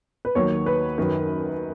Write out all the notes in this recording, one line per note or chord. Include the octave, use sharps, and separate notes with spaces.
B4
D#2 D#3 F#3 C#5
B4
F#2 D#3 F#3